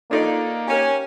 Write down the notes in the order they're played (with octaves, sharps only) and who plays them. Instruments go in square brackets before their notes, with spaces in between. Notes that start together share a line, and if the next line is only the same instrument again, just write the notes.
[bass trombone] A#3 [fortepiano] D4 D#4 D5 [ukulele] F4 A4 C#5
[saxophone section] C#4 [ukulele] G4 A#4